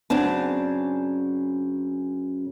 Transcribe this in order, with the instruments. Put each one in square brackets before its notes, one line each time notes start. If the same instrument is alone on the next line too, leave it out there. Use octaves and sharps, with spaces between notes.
[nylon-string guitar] F#2 C#3 C4 D4 A5